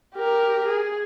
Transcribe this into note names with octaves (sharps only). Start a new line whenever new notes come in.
G4 A#4
G#4